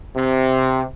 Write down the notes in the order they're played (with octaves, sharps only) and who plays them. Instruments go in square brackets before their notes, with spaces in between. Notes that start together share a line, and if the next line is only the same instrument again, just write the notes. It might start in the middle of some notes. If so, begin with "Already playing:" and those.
[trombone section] C3